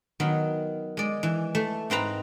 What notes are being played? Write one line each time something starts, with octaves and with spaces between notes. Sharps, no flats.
D#3 F#3 B3
G#3 D5
E3
A3
G#2 C4 B4 A#5